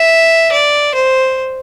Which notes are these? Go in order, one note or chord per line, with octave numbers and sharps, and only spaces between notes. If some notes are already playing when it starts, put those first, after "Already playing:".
Already playing: E5
D5
C5